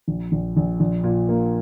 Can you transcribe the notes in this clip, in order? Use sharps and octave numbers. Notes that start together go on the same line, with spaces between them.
A#1
A#1
A#1
A#1
A#2
A#3